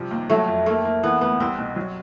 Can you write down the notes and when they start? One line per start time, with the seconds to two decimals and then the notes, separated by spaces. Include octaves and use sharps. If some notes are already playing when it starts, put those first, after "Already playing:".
Already playing: C3 F3 G3
0.11 D#2
0.30 F#3 A3
0.48 F2
0.66 A3 A#3
0.85 A#3
1.03 E3 B3
1.21 D2 B3
1.40 C2 C4
1.59 B2
1.76 F#3